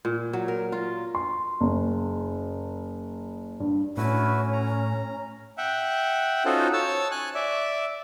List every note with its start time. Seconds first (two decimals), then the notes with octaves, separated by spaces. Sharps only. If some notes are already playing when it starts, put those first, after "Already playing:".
0.05 A#2
0.33 F#3
0.48 A#4
0.72 F4
1.15 C6
1.61 F#1
3.60 G2
3.97 A2 C#4 E4 F#4 B4
4.53 A#5
5.58 E5 F#5 G5
6.45 C#4 D#4 F4 F#4 A4 C5
6.73 C#5 A5 E6
7.11 G#5 F#6
7.35 D5 E5